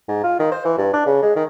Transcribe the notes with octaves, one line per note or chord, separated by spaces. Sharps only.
G#2
F4
D#3
C5
E3
G2
D4
C#3
G#3
D#3